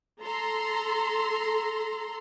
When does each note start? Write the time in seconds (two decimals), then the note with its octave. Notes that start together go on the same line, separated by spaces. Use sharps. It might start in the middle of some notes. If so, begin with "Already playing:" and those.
0.20 A4 A#5 C6